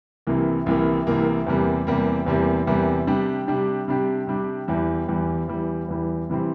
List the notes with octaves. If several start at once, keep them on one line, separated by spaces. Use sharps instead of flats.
C2 C3 E3 A#3
C2 C3 E3 A#3
C2 C3 E3 A#3
E2 C3 G3 A#3
E2 C3 G3 A#3
E2 C3 G3 A#3
E2 C3 G3 A#3
C3 G3 D4 G4
C3 G3 D4 G4
C3 G3 D4 G4
C3 G3 D4 G4
E2 E3 G3
E2 E3 G3
E2 E3 G3
E2 E3 G3
C3 E3 G3 C4